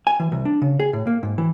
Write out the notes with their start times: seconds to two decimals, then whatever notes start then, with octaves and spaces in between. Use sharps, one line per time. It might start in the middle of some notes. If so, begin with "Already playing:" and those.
0.07 G#5
0.20 E3
0.32 C2
0.45 D4
0.62 C#3
0.80 G#4
0.93 A2
1.07 A#3
1.23 G#2
1.38 E3